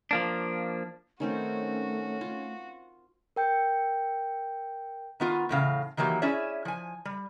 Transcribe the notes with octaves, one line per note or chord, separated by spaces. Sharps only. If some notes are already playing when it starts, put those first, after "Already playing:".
F3 A#3 D4
D#3 A3 C4 C#4 F#4 C5
F4
A#4 G5 G6 C#7
D#3 B3 F4
E2 A2 C#3 F5
D#3 E3 F#3 A#3 G4
C#4 E4 G#4 C#5 D5 E5
F3 G#5
G3